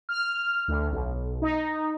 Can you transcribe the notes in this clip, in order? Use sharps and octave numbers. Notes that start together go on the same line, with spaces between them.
F6
D2
B1
D#4